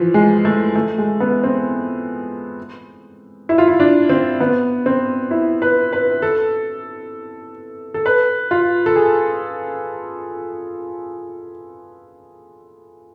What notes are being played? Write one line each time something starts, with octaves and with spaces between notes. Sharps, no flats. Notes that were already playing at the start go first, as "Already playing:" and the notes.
Already playing: E3 F3
G#3
A3
A3
G#3
B3
C4
E4
F4
E4
D4
C4
B3
C4
E4
B4
B4
A4
A4
B4
F4
A4
G#4